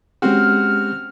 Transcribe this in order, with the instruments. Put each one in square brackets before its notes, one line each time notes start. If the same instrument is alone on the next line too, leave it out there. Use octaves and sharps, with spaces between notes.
[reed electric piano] G#3 C#4 G4 [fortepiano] C4 F#4 [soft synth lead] F6